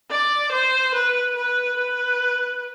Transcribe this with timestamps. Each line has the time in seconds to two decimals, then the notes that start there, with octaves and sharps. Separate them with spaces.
0.11 D5
0.52 C5
0.94 B4
1.36 B4
1.77 B4